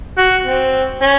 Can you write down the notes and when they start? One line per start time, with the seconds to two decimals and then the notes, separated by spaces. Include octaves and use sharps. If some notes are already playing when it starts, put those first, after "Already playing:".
0.17 F#4
0.45 C4
1.02 C#4